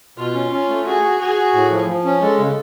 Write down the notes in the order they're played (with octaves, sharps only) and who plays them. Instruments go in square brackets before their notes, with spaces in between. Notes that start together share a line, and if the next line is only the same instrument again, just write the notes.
[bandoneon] B2 [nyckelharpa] F4
[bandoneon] C#4
C#4
A3
[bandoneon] F#4 [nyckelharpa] G#4
[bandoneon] F#4
[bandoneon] F#4 [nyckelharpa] G#4
[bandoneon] F#4
A2
F3
F3
C#4
[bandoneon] G#3 [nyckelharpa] A4
[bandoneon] C#3